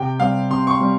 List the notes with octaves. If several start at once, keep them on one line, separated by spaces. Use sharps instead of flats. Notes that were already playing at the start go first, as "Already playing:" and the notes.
Already playing: C3 G5
G3 C4 F5
C3 C6
C#6
C6
G3 C4